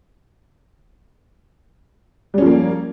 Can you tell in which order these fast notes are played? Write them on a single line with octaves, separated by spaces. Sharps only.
G3 C#4 F3 A#3